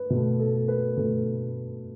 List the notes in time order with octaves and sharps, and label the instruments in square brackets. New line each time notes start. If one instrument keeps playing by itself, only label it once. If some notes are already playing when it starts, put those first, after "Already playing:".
Already playing: [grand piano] B4
B2 A3
A4
B4
B2 A3 A4